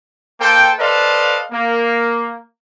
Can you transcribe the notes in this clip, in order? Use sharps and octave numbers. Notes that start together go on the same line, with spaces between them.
A#3 A4 C5 G5
A4 B4 C5 D5 D#5 F5
A#3